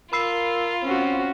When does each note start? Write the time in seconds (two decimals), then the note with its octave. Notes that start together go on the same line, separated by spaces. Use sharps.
0.13 F4 A#4 B5 E6 C7
0.83 C4 C#4 F#4